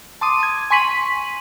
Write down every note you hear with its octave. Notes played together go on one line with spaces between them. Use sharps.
A5 C6 D6 D#6 D#7
G#6
G#5 C6 C#6 B6 D#7 F#7